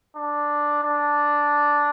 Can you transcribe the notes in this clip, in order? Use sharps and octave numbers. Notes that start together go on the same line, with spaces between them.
D4
D4